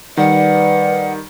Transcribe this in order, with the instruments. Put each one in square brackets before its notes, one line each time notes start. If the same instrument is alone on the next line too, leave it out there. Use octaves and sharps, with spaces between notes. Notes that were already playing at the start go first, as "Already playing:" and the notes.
[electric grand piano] D#3 G3 [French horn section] B4 D5 [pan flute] F#5